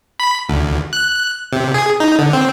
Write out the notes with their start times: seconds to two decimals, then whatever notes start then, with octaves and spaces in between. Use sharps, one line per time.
0.20 B5
0.49 D2
0.93 F#6
1.53 C3
1.74 G#4
2.00 D#4
2.19 D3
2.33 C4